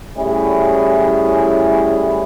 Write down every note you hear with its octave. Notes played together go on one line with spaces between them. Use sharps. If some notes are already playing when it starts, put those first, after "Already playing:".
A2 G3 C#4 E4 G#4